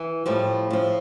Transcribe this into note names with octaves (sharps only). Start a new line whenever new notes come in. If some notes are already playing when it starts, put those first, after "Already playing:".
Already playing: E3
A2 F3 G3
A2 F3